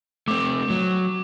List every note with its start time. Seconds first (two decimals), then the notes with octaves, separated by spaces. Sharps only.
0.28 A3 C4 D6
0.70 F#3